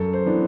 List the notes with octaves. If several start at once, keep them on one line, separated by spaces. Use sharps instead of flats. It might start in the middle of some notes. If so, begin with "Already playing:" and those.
Already playing: F#2 A4
C5
E3 B3 D4